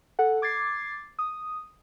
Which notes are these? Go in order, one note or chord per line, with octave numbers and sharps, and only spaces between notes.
A4 F#5
D6 G#6 A6 C7
D#6